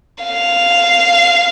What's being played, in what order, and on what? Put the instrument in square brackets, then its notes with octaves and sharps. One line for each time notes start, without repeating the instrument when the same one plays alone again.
[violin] F5